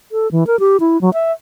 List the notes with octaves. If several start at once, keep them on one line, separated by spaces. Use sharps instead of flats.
A4
E3
A#4
G4
E4
F#3
E5